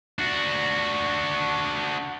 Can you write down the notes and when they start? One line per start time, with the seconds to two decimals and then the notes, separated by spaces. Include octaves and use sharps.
0.19 D4 F#4